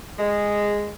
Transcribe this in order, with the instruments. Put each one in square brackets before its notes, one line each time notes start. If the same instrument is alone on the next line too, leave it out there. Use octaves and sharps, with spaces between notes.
[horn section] G#3